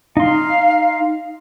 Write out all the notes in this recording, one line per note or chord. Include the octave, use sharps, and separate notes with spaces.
D#4 F5 C6